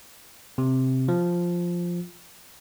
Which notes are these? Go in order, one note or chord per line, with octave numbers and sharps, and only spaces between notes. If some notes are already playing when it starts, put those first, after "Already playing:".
C3
F3